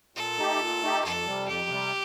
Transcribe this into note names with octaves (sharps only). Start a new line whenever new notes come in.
A#2 A4
A3 D#4 G4
A#2
A3 D#4 G4
F2 A4
C3 G3
F2 G4
C3 G3